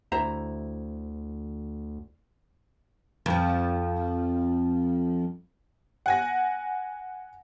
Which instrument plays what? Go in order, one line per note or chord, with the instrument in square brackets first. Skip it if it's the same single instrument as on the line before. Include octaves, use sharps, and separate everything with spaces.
[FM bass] D2 [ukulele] E4 C5 A#5
[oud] F2 F3
[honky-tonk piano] F#5 G#5 A#6